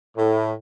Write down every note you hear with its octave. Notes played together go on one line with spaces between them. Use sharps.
A2